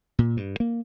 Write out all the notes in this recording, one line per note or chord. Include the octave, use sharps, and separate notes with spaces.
A#2
G2
A#3